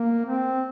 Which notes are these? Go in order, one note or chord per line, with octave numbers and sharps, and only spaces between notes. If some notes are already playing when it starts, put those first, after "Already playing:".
Already playing: A#3
C4